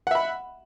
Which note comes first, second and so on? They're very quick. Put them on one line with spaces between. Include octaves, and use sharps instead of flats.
F#5 E5 B5